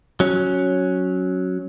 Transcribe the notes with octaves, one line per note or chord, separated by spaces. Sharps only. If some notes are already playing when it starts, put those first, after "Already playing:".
F#3 C#4